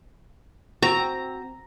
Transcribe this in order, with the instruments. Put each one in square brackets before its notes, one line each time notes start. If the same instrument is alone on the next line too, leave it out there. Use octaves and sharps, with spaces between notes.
[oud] C4 F#4 [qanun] A#5